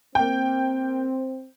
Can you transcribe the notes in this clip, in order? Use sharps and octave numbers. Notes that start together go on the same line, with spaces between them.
A#3 C4 G5